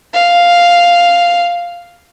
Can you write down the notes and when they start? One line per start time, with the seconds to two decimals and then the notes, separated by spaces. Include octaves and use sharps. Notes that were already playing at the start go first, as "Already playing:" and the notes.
0.14 F5